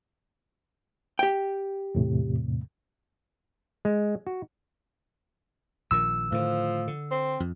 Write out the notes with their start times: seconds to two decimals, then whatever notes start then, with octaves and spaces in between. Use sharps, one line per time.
1.19 G4 G5
1.95 E2 A2 C3
3.85 G#3
4.27 F#4
5.91 A#1 A#2 D#3 E6
6.32 A2 D3 D#3 F3
6.87 D3
7.11 C4
7.40 F2